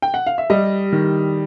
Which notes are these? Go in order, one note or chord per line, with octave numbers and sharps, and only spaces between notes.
G5
F#5
F5
E5
G3 D#5
D#3